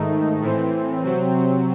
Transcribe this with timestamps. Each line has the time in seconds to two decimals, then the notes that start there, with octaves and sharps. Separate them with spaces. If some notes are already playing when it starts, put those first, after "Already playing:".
Already playing: G#2 D#3 A3 D#4
0.41 A2 E3 C4
1.03 C3 F#3 C4